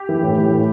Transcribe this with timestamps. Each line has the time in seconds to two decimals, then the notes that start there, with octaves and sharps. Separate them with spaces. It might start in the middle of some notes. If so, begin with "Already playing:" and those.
Already playing: G4
0.09 E3
0.23 A2
0.38 E3
0.52 A2